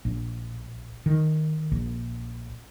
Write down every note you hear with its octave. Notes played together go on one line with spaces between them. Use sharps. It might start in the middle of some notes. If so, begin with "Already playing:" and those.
A#1
D#3
A#1